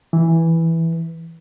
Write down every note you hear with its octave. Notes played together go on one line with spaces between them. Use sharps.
E3